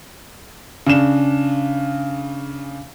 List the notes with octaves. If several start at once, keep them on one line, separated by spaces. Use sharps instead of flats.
C#3 D4 E7